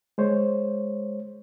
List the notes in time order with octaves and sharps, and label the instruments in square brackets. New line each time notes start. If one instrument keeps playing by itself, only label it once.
[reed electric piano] G#3 C5 C#5